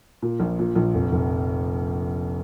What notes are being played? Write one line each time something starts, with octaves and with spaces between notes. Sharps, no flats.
A#2
A#1
A#2
A#1
F1
F1